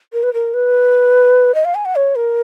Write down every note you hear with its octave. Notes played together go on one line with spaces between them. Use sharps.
A#4
B4
A#4
B4
D#5
F5
G#5
F#5
C#5
A#4